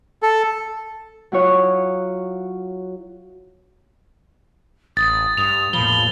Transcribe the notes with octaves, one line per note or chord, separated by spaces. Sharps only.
A4
F#3 E4 F4 C#5 F#5 D#6
A1 D#6 A6
G2 F7
A1 E2 A#2 F3 B5 G7